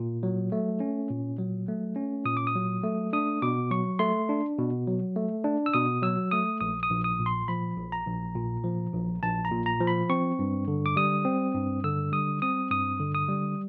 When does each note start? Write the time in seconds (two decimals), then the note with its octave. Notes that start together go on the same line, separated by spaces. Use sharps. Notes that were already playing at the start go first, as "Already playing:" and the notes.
Already playing: A#2
0.23 F#3
0.52 A3
0.80 C#4
1.10 A#2
1.39 F#3
1.68 A3
1.96 C#4
2.25 A#2 D#6
2.37 D6
2.47 D#6
2.55 F#3
2.84 A3
3.13 D4 D#6
3.42 B2 D6
3.71 F#3 C#6
3.99 A3 C6
4.29 D4
4.58 B2
4.87 F#3
5.16 A3
5.44 D4
5.66 E6
5.73 B2 D#6
6.02 F#3 E6
6.31 A3 D#6
6.61 A#1 D#6
6.83 D#6
6.90 A#1
7.04 D#6
7.19 A#2
7.26 C6
7.48 F3 B5
7.77 A#1
7.92 A#5
8.06 A#1
8.35 A#2
8.64 F3
8.93 A#1
9.22 A#1 A5
9.45 A#5
9.51 A#2
9.66 A#5
9.80 F3
9.87 B5
10.09 C4 C#6
10.39 G2
10.68 D3
10.86 D6
10.96 G3 D#6
11.25 C4
11.54 G2
11.84 D3 E6
12.12 G3 D#6
12.42 C4 D#6
12.71 G2 D#6
13.00 D3
13.15 D#6
13.28 G3